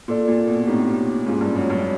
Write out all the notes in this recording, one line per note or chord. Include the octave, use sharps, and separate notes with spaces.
A#2 F4 A4 D5
A#2
B2
A2 C4 D#4 G4
G#2 A#3 C#4 F4
G2
F#2
G2